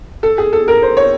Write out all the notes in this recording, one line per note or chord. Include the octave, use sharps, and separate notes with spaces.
A4
G#4
A4
A#4
C5
C#5